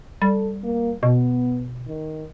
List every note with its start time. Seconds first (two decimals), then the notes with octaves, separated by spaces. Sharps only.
0.22 G3 A4
0.63 A#3
1.03 B2 B3
1.87 D#3